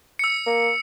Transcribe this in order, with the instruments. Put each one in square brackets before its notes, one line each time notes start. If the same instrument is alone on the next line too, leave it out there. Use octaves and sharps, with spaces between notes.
[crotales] E6 C#7
[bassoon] A#3